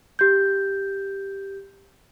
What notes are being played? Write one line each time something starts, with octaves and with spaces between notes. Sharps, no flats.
G4 G6